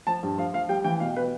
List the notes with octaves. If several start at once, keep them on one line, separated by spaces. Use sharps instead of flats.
F3 A5
G2
F3 F5
F3 F5
G3 G5
E3 G5
B2 F5
B4